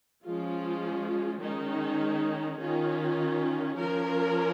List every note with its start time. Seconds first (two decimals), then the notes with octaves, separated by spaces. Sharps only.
0.25 F3 G#3 C#4 F4
1.42 D#3 G#3 C#4 D#4
2.59 D#3 C#4 F4
3.77 F3 C#4 A#4